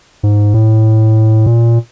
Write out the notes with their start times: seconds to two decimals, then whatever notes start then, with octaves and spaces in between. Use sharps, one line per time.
0.23 G#2
0.54 A2
1.46 A#2